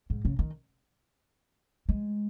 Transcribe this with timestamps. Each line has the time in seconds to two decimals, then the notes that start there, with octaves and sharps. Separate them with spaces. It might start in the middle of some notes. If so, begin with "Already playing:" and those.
0.10 G#2
0.25 C#3
0.39 D#3
1.89 G#3